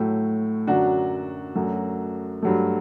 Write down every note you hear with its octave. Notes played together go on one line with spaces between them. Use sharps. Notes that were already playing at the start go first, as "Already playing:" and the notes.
Already playing: A2 F#3 A3
F#2 D3 F#3 D4 F#4
F#2 F#3 A3
G2 F#3 A3